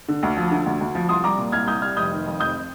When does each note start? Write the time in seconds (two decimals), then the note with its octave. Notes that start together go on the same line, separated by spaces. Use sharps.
0.08 D3
0.23 D2
0.37 F3
0.51 D3
0.66 D2
0.81 D2
0.95 F3
1.09 C2 C6 D#6
1.24 G3 A#5 D6
1.38 A#2
1.52 C2 F6 G#6
1.67 C2 D#6 G6
1.82 G3 F6 G#6
1.97 F1 D#6 G6
2.11 D#3
2.26 F2
2.40 F1 D#6 G6